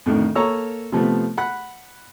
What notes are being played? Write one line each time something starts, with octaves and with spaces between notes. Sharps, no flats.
F2 A2 D3 D#3
A#3 A4 C#5 A#5 E6
C3 F3 A3 B3
F#5 B5 F#6